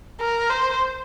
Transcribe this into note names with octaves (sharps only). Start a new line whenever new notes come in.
A#4
C5